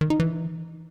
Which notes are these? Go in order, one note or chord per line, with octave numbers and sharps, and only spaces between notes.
D#3
D#4
E3